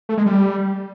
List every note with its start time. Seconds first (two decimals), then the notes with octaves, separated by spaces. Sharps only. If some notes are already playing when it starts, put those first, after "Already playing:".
0.09 A3
0.18 G#3
0.26 G3